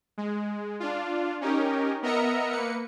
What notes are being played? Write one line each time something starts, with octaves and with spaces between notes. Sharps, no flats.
G#3
D4 F4
C#4 D#4 G4 A#4
B3 A#4 D#5 E5 A#5 C#7
A#3 B4 C#7